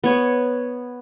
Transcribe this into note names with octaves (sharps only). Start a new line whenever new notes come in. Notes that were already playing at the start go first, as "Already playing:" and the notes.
B3 C#5